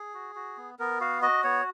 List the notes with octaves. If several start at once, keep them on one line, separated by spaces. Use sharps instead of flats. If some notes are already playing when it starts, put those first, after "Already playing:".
Already playing: G#4
F#4
F#4
B3
B3 A#4
F#4 F5
F#4 D#5
B3 C#5